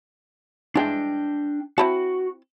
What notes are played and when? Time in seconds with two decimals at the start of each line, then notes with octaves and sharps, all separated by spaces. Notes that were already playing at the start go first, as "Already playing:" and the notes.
0.75 E3 G#3 D4 G5
1.78 C4 E4 F#4 A5